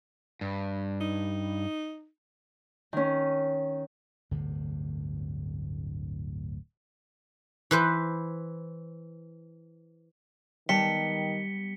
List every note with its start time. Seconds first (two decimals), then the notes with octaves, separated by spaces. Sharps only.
0.41 G2
1.01 D#4
2.93 D#3 C#4
4.31 D1 G1 D2 C3
7.71 E3 B4 C5
10.69 D#3 G3 B3 G4 A5 B6 C#7 G7